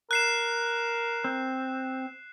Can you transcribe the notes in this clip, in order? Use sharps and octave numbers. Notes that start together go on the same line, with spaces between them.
A#4 F#6 C7 E7
C4